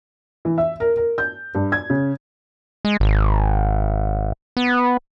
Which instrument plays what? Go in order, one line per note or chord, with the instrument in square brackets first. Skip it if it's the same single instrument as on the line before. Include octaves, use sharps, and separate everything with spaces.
[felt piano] E3
E5
A#4
A#4
G6
G2
G#6
C#3
[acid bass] G#3
G#1
B3